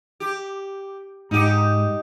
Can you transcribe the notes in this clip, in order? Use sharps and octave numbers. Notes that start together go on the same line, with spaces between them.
G4
G#2 D#4 G4